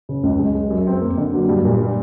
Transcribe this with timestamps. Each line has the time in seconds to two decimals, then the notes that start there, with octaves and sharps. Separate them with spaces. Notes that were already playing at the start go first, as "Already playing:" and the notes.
0.09 C#3
0.23 C#2
0.39 G#3
0.55 G#3
0.70 F#2
0.87 C4
1.01 A#3
1.17 D3
1.34 F#3
1.49 G2
1.65 A#2
1.81 G3